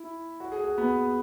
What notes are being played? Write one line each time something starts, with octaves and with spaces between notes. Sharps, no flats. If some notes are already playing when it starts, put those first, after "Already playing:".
Already playing: E4
F#4
G#4
F#4
B3